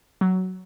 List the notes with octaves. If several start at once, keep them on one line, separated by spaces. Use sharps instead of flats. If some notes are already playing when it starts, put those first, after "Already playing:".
F#3